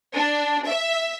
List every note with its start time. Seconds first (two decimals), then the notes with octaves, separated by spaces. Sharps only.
0.16 D4
0.67 E5